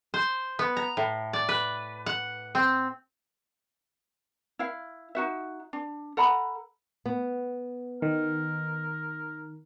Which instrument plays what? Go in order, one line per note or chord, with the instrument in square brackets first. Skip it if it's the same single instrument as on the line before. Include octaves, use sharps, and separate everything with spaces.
[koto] C5
B3
A#5
A2
D5
B4
F#5
C4
[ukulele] E4 F5
D#4 F#4 E5
D4
A4 F#5 A#5 B5
[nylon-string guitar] B3
[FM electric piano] D#3 [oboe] A#4